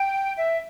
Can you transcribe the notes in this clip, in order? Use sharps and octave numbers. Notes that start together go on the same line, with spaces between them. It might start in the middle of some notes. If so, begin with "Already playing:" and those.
Already playing: G5
E5